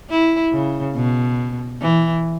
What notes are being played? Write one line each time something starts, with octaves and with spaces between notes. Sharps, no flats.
E4
C#3
B2
E3